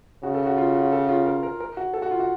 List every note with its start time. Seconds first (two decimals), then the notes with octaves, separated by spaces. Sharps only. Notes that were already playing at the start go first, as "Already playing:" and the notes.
0.23 C#3 F#4
0.34 A4
0.46 F#4
0.58 F4
0.75 F#4
0.92 A4
1.01 F#4
1.09 F4
1.26 A#4
1.43 A#4
1.60 A#4
1.77 F#4
1.94 A4
2.02 F#4
2.11 F4
2.20 F#4